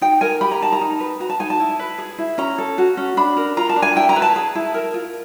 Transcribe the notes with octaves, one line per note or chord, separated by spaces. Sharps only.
D#4 G5
A#4 G#5
G4 B5
A#5
D#4 A5
A#5
D#4
B4
F#4 A#5
A5
D#4 G#5
A5
E4
B4
G#4
E4
C#4 A#5
A4
F#4
C#4
D4 B5
A#4
F4 A#5
A5
D4
G#5
E4 G5
A#5
B4
A5
G#4 A5
E4
A#4
F4